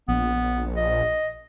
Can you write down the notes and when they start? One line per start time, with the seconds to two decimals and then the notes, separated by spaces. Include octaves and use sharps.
0.08 A#1 B3
0.76 D#5